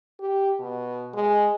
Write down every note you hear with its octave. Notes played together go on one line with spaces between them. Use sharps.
G4
B2
G#3